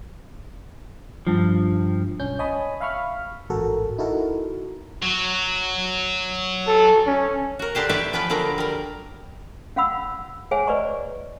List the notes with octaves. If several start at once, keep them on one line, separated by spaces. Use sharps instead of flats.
G2 F3
B1 C#4 G6
C#5 D#5 G#5 A5 B5 D#6
E5 F5 B5 C#6 F6
A1 G#2 F#4 A4 A#4
D#4 E4 F#4 A4 A#4
F#3
A4
C#4
F#4 A#4
D3 D4 G4 C5
G4 B4 C#5 D5 E5 G5
F3 B3 C#4 B4 G5
D3 F3 F#3 A#4 A#5
G3 A#4
C#4 F5 F#5 B5 E6
G#4 C5 C#5 E5 F#5 G#5
B4 C5 D5 D#5 A#5 C#6